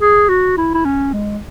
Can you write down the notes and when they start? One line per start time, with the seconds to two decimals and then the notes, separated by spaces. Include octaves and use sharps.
0.01 G#4
0.29 F#4
0.57 E4
0.74 E4
0.85 C#4
1.13 G#3